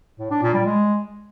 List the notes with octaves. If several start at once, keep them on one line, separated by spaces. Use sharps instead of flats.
A2
D4
A#2
G3
G#3